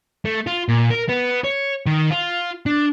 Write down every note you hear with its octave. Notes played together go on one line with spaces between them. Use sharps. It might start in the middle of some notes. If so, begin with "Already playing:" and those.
A3
F4
A#2
A#4
B3
C#5
D#3
F4
D4